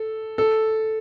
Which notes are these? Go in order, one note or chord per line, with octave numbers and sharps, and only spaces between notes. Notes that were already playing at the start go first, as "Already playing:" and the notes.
Already playing: A4
A4